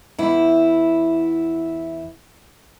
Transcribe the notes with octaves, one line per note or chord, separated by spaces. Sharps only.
E2 E4